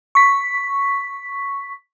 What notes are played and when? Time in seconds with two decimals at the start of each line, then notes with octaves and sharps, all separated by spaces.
0.15 C#6 B6